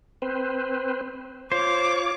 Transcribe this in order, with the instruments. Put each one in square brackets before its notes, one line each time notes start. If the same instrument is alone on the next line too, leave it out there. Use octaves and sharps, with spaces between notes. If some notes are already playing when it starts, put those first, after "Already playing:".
[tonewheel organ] C4 B4 C5
[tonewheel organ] F4 C#5 [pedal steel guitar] C5 [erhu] D6